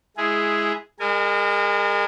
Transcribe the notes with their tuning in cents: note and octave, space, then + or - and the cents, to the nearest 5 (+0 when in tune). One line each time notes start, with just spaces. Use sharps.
G#3 +10 E4 +0 G#4 +0
G#3 -40 A#4 -30 G#5 +0